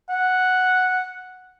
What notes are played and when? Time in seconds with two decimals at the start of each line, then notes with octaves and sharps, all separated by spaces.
0.10 F#5